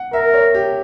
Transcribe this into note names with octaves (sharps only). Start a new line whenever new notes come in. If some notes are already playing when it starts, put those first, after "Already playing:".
Already playing: F#5
A#4 E5
C#5
G4